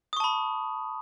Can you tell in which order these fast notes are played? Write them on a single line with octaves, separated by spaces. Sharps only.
D#6 C#6 A5 B5